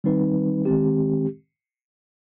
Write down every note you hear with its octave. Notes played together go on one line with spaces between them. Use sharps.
D#3 G3 C4 D#4 B4
D#3 G#3 C4 G4